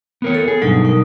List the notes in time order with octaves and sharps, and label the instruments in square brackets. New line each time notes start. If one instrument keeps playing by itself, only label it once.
[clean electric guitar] B3 A#4 C#5
[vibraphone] A4
[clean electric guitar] G#4
[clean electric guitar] G2 B2 D4 [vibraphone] F#3 D#4
[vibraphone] D#4 A#4